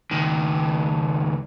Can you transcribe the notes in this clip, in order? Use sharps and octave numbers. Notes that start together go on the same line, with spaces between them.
C#2 D#3